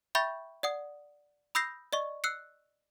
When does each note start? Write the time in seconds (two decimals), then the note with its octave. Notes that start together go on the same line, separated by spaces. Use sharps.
0.15 E5 G5 B5 C#6 G6 A6
0.63 D5 F#5 D#6
1.55 B5 D#6 E6 G6 A#6 C7
1.93 D5 D#5 C#6
2.24 E6 F#6 C7 C#7